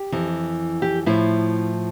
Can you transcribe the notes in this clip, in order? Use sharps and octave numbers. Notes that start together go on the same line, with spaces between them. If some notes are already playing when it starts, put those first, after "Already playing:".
Already playing: G4
F2 E3
G4
A2 F3 E4